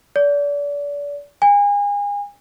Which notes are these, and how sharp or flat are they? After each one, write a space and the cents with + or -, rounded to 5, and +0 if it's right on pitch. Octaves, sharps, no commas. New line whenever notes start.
D5 -35
G#5 -35